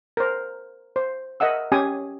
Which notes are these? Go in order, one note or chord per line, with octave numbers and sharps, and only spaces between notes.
A#4 C5
C5
A#4 D#5 E5 F#5 E6
C#4 G4 G#5 D#6